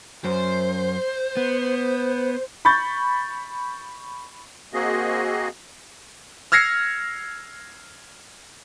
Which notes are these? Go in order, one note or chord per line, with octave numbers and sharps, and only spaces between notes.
F#2 C5
B3
B5 C#6 G6 A6
A#3 C4 F#4 G#4 D#5
E6 F6 G#6 A#6 C7 C#7